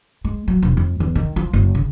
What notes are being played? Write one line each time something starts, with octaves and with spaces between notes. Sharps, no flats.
G#3
F#3
E1
F2
E2
D#3
F3
F#1
C#3